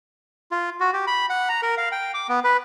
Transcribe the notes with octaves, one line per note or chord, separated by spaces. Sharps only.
F4
F#4
G4
B5
F#5
A#5
A#4
F5
G5
D6
B3
B4